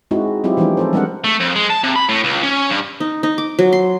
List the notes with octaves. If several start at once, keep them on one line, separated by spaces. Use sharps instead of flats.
G#3 C4 D#4 E4 F#4
F#3 C4 E4 F4 G4
E3 F3 G3 A3 C#4 D#4
C4 A4 C5
G3 G#3 C4 D4 A#4 F#5
A3
F2
G#3
A5
C3
B5
A2
C#2
C#4
G2
D#4
D#4
D6
F#3
C6